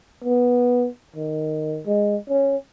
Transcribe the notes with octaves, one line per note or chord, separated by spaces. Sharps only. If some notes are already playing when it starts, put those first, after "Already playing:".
B3
D#3
G#3
C#4